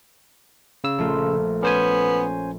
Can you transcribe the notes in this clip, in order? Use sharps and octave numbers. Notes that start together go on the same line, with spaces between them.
C#3 E6
A#1 A3 F4
B3 C#4 C5 G#5